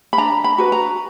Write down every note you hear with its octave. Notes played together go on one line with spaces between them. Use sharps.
B5
D4 A#5
B5
F#4 B4
A#5